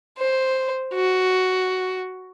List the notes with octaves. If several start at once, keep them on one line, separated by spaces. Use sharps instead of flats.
C5
F#4